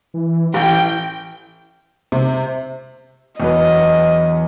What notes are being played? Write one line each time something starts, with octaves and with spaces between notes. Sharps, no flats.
E3
A1 E3 G5
C3
E2 F#3 B4 D#5